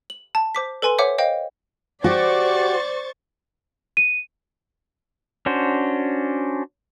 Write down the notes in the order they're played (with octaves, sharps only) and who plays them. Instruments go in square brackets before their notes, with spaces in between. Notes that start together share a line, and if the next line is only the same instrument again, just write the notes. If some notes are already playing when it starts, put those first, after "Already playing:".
[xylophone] F#7
A5
C5 D6 B6
A4 B4 G#5 C6 D#7
C5 C#5 E5 F#5 D6
C5 D#5 F5 G5
[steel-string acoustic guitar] F#4 G4 [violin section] C5 C#6 A6 [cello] D5
[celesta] D#7
[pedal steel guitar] C#4 D4 F#4 C5